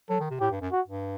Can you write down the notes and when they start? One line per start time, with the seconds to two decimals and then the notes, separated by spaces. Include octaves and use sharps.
0.09 F#3 A4
0.20 D#3
0.31 C3
0.40 A2 G4
0.51 G2
0.61 F#2
0.72 F#4
0.87 G2